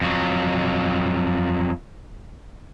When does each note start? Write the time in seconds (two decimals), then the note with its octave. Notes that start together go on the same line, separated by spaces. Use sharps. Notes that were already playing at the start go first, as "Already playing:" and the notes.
0.01 F2 F#3